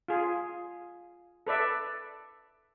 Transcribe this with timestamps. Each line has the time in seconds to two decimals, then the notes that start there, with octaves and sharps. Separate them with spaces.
0.08 F4 G#4
1.47 A4 B4 D5 E5